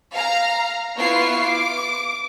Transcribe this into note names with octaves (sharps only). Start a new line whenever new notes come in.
F5 A#5
B3 E4 F4 C#6 C7
D6